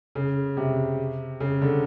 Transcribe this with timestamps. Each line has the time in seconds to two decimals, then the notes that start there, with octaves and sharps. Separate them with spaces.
0.15 C#3
0.57 C3
1.40 C#3
1.61 D3